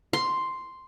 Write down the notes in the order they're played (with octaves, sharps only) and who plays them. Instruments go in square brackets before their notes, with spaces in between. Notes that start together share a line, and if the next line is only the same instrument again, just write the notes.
[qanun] C6